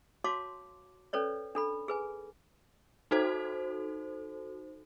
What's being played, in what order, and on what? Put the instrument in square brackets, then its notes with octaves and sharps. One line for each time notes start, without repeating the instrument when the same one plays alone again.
[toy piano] F#4 C#5 F5 A5 C6 D6
C#4 A4 B4 C#5 D5
D4 A4 B5
G#4 B4 G#5
[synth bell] D#4 F#4 A4 C5